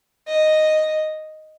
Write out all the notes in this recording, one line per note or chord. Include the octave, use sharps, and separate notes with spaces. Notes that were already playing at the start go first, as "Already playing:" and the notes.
D#5